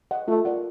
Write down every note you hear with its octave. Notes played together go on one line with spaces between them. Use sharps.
D#5 F#5
A3 F4
A#4 D5 F#5